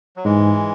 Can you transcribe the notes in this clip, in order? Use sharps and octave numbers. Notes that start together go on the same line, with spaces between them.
F#3
G#2 E3 G#3